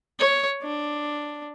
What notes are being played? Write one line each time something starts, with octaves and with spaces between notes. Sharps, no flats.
C#5
D4